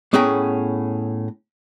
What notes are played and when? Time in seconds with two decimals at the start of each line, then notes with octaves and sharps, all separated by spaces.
0.13 A2 B3 C#4 G#4 G5 A#5